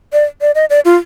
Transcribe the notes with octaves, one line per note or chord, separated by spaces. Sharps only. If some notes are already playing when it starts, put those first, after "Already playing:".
D5
D5
D#5
D5
F4